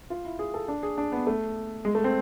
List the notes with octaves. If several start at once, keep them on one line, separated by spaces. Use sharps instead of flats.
F4
E4
G#4
A4
D4
G#4
D4
B3
A3
G#3
A3
C4